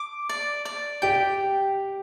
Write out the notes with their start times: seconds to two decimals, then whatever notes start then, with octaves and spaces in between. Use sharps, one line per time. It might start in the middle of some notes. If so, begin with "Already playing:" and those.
Already playing: D6
0.29 D5
0.65 D5
1.02 G4 G5